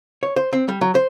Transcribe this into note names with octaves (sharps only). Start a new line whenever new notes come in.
C#5
C5
C4
G3
F#3
C5